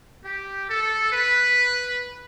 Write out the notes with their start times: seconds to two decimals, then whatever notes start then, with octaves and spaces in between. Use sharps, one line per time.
0.25 G4
0.69 A4
1.11 B4